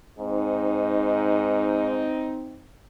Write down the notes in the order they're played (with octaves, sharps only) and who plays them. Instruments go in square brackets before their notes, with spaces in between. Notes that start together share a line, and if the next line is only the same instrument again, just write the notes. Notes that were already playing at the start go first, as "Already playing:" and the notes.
[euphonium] G#2 [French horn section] C4 D#4